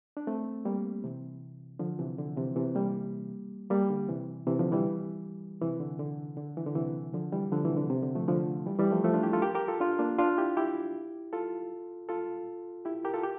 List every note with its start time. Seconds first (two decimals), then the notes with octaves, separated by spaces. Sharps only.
0.17 D4
0.27 A3 C4
0.65 G3 A#3
1.04 C3 E3
1.79 D3 F3
1.99 C3 E3
2.18 D3
2.37 C3 E3
2.56 C3 E3
2.75 G3 A#3
3.70 G3 A#3
3.89 D3
4.09 C3 E3
4.47 C3 E3
4.59 D3 F3
4.72 E3 G3
5.61 C3 E3
5.80 D3
5.99 D3
6.37 D3
6.57 E3
6.66 D3
6.75 C3 E3
7.13 D3 F3
7.32 E3 G3
7.52 D3 F3
7.64 C3 E3
7.77 D3
7.90 C3
8.03 D3
8.15 F3 A3
8.28 D3 F3
8.66 E3 G3
8.79 E3 G3
8.92 F3 A3
9.04 F3 A3
9.13 D4 F4
9.23 E4 G4
9.33 F4 A4
9.42 G4 A#4
9.55 G4 A#4
9.68 F4 A4
9.80 D4 F4
9.99 A#3 D4
10.18 D4 F4
10.38 E4 G4
10.57 E4 G4
11.33 F4 A4
12.09 F4 A4
12.85 E4 G4
13.04 G4 A#4
13.14 F4 A4
13.23 G4